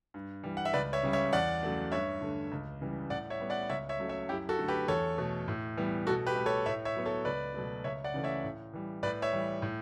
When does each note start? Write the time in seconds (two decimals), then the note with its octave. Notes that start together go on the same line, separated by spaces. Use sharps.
0.14 G2
0.44 E3 G3
0.57 F#5
0.65 E5
0.73 C#2 B4 D5
0.93 C#5 E5
1.03 C#3 G3
1.13 C#5 E5
1.33 E2 D5 F#5
1.63 C#3 F#3 A3
1.92 G2 C#5 E5
2.21 D3 A3
2.52 C#2
2.81 C#3 E3 G3
3.10 A2 D5 F#5
3.30 C#5 E5
3.40 G3 B3
3.50 D5 F#5
3.70 C#2 C#5 E5
3.89 C#5 E5
3.99 C#3 F#3 A3
4.09 C#5 E5
4.29 F#2 E4 G4
4.49 F#4 A4
4.58 D3 A3
4.68 G4 B4
4.88 E2 A4 C#5
5.18 B2 A3
5.48 A2
5.77 E3 G3 B3
6.07 B2 F#4 A4
6.27 G4 B4
6.36 A3
6.46 A4 C#5
6.66 A2 C#5 E5
6.85 C#5 E5
6.95 F#3 B3
7.06 A4 C#5
7.25 C#2 B4 D5
7.54 B2 F#3 A3
7.84 C#2 C#5 E5
8.04 D5 F#5
8.14 C#3 E3 A3
8.24 C#5 E5
8.44 A2
8.73 E3 G3
9.03 A2 B4 D5
9.22 C#5 E5
9.33 E3 G3
9.62 A2